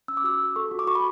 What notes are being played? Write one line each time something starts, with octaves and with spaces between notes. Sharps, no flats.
C#4 E6
D6
F#4 E6
F#4
A4 C#6
F#4
D6
F#4 C#6
B5